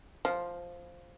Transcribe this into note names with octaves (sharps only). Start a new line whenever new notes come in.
F3